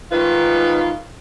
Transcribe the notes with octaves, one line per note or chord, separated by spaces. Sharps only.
G#2 D#3 F4 B4